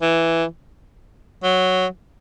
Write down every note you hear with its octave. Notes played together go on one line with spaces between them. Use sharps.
E3
F#3